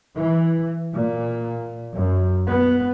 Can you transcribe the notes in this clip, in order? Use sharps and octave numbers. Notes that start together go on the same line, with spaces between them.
E3
A#2
F#2
B3